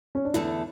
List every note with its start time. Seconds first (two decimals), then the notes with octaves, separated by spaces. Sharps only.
0.15 C#4
0.25 D4
0.34 E2 D3 A3 E4